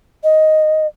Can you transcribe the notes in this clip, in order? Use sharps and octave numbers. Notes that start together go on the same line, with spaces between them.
D#5